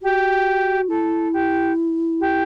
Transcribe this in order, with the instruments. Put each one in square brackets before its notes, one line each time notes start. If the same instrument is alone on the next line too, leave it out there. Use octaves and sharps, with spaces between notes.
[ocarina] F#4 [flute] G4
[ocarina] E4 [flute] A4
[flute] G4
G4